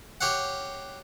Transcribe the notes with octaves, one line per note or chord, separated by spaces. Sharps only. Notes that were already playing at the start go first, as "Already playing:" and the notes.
G4 C#5 F5 F#5